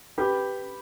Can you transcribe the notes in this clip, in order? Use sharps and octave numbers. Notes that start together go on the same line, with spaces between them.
G4 B4